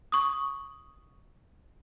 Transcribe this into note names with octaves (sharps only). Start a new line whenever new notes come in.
C#6 D#6